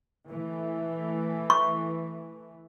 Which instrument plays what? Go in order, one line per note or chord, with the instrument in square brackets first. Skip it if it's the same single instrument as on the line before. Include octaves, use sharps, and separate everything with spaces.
[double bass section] E3 A3
[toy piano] C#6